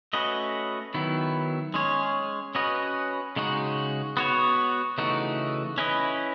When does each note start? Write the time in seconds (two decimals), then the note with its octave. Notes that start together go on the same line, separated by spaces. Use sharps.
0.13 A3 C#4 F#4 B4 D#5
0.94 D#3 F#3 B3 E4
1.74 G#3 C#4 G#4 C#5
2.55 C#4 F#4 B4 D#5
3.36 C#3 G#3 D#4 F#4
4.17 B3 F#4 C#5
4.98 C#3 E3 A3 D#4 F#4
5.78 C#4 E4 B4 D#5